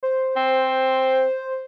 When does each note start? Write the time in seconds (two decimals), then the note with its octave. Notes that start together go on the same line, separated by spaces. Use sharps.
0.03 C5
0.37 C4